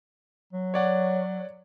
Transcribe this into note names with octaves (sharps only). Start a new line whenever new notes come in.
F#3
C#5 D5 F#5